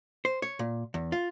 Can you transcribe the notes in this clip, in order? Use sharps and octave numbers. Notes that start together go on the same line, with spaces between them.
C5
C#5
A#2
E2
F4